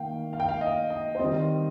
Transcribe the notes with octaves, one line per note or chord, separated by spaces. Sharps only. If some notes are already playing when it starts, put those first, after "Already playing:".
Already playing: D#3 A#3 F5 G5
F5
G5
F5
D#5
D#5
C5
D#3 G3 C4 D#5